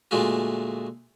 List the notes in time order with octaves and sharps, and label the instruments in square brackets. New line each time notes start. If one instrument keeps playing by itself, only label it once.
[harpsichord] A#2 D3 G#3 A3 F4 F#4